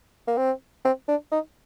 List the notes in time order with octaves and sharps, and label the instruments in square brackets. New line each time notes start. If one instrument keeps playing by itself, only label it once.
[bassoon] A#3
C4
C4
D4
D#4